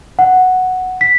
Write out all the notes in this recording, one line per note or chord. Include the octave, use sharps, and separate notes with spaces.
F#5
B6